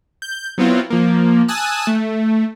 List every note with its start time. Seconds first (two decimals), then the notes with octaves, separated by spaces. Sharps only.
0.22 G6
0.58 F#3 B3 C4 E4 F4
0.90 F3 A#3
1.48 G#5 A5 D#6 E6 F#6
1.87 A3